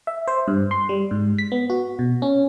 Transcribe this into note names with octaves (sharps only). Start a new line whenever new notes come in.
E5
C5
G2
C6
G3
G#2
B6
B3
F#4
B2
C#4